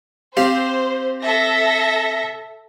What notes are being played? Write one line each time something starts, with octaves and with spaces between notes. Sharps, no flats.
C4 G4 C5 F5
A4 E5 A#6